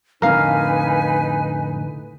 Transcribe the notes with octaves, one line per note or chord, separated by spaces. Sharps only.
F2 A2 D3 D#4 A#4 B4 F5 G#5